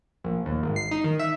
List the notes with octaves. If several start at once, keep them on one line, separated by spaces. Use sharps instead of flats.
A#1
D#2
G#1
C7
D#4
D#3
E5